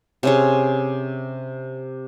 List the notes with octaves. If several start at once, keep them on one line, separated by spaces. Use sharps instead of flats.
C3 C#4 G#4